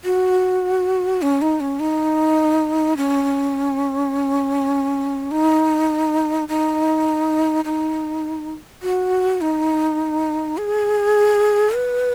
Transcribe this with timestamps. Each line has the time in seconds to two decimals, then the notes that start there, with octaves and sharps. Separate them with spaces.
0.04 F#4
1.22 C#4
1.42 D#4
1.60 C#4
1.80 D#4
2.97 C#4
5.31 D#4
6.49 D#4
7.65 D#4
8.82 F#4
9.41 D#4
10.58 G#4
11.75 B4